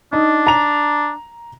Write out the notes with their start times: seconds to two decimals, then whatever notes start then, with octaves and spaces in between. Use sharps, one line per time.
0.13 D4 D#4
0.47 A#5 F7